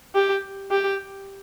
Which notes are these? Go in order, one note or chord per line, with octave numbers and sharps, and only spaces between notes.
G4
G4